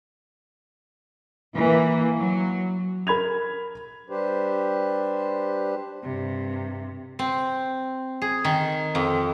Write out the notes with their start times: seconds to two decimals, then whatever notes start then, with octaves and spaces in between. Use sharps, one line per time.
1.54 E3 A#3
2.18 F#3
3.07 A#4 B5 G#6 F7
4.10 G3 D4 G4 B4 C5
6.03 G2 C3
7.19 C4
8.22 G#4
8.44 D#3
8.95 F2